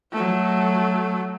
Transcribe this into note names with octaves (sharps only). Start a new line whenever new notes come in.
F#3 A3